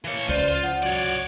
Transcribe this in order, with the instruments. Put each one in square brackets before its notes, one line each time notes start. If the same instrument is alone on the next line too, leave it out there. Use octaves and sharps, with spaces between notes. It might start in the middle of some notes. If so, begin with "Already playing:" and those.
[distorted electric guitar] E3 C#5 [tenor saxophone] A#3
[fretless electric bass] C#2 [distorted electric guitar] F4 [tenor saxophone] C5 [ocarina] D5
[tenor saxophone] F3 [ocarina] F#5
[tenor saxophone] F#3 [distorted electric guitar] C#5 D5